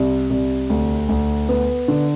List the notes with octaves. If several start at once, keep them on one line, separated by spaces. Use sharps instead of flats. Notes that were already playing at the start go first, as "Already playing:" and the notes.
Already playing: C2
C2
D2
D2
B3
D3